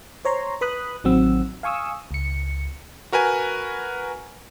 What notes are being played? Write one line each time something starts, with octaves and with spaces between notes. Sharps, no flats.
C5 C#5 A#5 C6
B4 B5 D#6 F#6
A1 D#3 F#3 C4 F#5 E6
F5 G#5 C#6 D#6 E6
C#2 C#7
F#4 A#4 B4 G#5